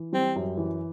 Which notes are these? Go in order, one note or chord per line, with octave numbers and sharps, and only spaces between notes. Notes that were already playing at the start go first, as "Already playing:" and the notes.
Already playing: E3
G3 C4
F#2
E3